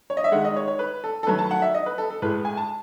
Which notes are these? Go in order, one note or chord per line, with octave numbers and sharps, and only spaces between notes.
C#5
D#5
E5
D#3 G#3 F#5
D#5
C#5
C#5
B4
A4
A4
D#3 F#3 A3 B4
A5
F#5
E5
D#5
B4
A4
A4
A2 G#3 B4
G#5
A5